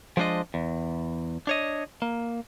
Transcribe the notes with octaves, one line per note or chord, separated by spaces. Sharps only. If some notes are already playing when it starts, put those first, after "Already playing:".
F3 G#3 B3 D4 C5 D#5
E2
D4 C#5 D#5
A#3